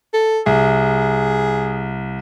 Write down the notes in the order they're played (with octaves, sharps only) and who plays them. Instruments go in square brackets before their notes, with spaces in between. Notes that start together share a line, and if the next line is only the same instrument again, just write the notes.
[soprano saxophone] A4
[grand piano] C2 [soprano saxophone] G#4